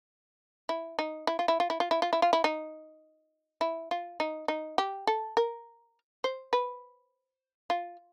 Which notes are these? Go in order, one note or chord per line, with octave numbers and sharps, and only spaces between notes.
E4
D#4
E4
F4
E4
F4
E4
F4
E4
F4
E4
F4
E4
D#4
E4
F4
D#4
D#4
G4
A4
A#4
C5
B4
F4